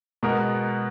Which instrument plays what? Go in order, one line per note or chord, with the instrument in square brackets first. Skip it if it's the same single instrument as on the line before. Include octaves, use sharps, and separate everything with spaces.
[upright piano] B2 G#3 B3 A#4